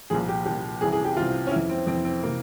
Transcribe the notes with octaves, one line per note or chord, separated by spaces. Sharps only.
C2 A#2 F3 G#4
G4
C2 A#2 F3 G4
C2 C3 E3 G#4
G#4
G4
C2 C3 E3 F4
C#4
F2 E3 E4
C4
F2 E3 C4
C4
C3 E3 A#3